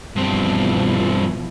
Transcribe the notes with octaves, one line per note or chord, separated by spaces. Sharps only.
G2 B2 E3 F3 C4